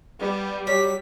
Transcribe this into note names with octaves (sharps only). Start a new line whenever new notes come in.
G3 B3
F#3 G4 B6